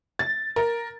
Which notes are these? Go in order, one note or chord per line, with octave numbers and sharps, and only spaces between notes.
A6
A#4